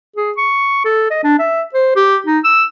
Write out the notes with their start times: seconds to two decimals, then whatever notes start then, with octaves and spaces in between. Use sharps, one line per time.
0.16 G#4
0.38 C#6
0.85 A4
1.11 D#5
1.24 D4
1.39 E5
1.74 C5
1.96 G4
2.27 D#4
2.45 E6